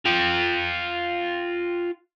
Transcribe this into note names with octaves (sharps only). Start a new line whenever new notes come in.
F4 G5